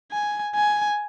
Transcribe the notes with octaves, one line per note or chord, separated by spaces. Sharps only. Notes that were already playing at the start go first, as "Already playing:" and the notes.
G#5
G#5